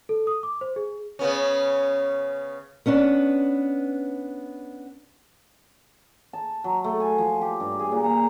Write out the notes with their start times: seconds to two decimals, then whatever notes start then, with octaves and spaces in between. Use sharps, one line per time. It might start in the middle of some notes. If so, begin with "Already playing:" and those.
0.09 A4
0.27 D#6
0.43 D6
0.61 C5
0.76 G#4
1.19 C#3 B3 C#4
2.86 B3 C#4 D4 B4
6.33 A5
6.64 F#3
6.84 A3
7.00 G#5
7.18 F3
7.41 G4
7.60 G2
7.79 G#4
7.92 A#2
8.04 A#5